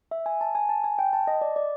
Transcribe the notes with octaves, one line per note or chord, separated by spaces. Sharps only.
E5
G#5
A5
G#5
A5
G#5
G5
A5
D#5
D5
D5